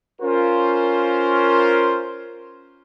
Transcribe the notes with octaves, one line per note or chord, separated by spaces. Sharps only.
C#4 F4 A#4 C5